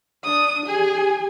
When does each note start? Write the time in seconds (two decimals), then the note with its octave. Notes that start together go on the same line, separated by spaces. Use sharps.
0.24 D4 D#6
0.67 G4 G#4 G#5